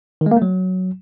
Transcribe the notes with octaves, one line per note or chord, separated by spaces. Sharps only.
D#3
G#3
A#3
A3
F#3